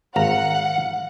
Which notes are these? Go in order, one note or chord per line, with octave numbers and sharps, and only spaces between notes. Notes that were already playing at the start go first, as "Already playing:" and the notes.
G#1 F5 F#5 A#5